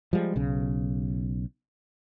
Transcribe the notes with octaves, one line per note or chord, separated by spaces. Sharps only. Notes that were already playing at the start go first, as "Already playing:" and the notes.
F3 G3 G#3
B1 C#3